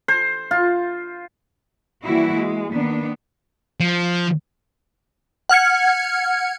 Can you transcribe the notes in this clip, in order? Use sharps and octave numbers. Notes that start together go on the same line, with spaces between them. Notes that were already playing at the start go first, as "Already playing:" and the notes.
C5
F4
E3 G3 A#3 E4 F#4
G#3
D#3 A#3 B3 D4
F3
F#5 F6 G#6 C#7